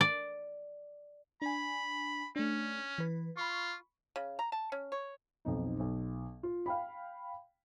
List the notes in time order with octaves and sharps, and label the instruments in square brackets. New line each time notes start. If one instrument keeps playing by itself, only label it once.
[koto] D5
[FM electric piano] D4 G#5 [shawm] B5
[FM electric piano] A3 D4 [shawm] C#4
[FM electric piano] E3 B4
[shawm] F4 [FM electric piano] B5 C#6
[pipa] C#3
A#5
A5
C#4
C#5
[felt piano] B1 F2 D#4
B1
F4
F5 G5 B5